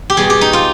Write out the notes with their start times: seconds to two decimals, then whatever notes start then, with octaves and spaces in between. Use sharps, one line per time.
0.10 G4
0.17 B2 G3 G#4
0.30 G4
0.41 D#4
0.53 F4